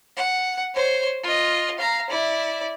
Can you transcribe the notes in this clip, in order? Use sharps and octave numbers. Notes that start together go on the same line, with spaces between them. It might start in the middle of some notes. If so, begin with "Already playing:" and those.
F#5
C5 C#5
F4 D#5
F5 A#5
E4 D5